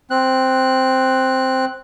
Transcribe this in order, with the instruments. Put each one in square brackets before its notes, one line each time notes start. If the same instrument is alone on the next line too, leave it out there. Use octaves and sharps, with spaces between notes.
[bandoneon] C4 F#6